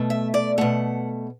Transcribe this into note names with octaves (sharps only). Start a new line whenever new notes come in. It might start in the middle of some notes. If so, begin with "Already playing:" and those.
Already playing: B2 A3
E5
D5
B2 A3 F#5